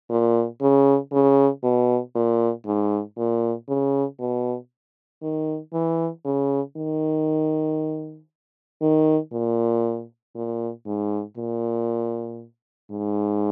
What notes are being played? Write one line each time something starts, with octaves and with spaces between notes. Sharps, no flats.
A#2
C#3
C#3
B2
A#2
G#2
A#2
C#3
B2
D#3
E3
C#3
D#3
D#3
A#2
A#2
G#2
A#2
G#2